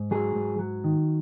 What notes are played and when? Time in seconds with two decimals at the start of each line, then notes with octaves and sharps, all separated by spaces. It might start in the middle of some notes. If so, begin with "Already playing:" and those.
Already playing: G#2
0.11 F#3 G#4
0.35 G#2
0.59 F#3
0.84 D#3